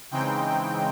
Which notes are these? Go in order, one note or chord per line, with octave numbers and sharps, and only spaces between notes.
C#3 E3 G#3 C4 D#4 G5